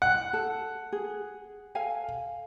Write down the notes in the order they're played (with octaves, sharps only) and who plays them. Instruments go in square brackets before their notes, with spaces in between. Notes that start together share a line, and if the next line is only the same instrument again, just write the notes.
[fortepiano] F#5
[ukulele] A4
G#4
A4 F5 G#5